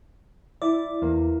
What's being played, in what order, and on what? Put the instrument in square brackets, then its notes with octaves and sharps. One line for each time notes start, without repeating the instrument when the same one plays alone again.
[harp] E4 [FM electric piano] D5
[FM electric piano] E2 [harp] A#3